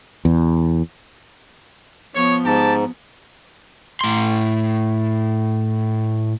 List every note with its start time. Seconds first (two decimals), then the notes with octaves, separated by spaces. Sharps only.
0.25 E2
2.14 F3 B3 C#5
2.45 G#2 G4 A5
4.01 A2 C6